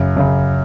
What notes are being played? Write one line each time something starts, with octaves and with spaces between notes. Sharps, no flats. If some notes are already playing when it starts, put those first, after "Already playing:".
Already playing: F#2 C#3
F#2 C#3